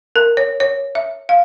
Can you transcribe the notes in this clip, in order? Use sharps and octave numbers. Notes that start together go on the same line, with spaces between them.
A#4
C#5
C#5
E5
F5